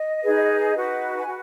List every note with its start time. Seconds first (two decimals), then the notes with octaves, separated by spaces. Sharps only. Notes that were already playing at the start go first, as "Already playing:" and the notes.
Already playing: D#5
0.23 D#4 G#4 B4
0.75 D#4 F#4 B4
1.20 G#5
1.27 F#4 B4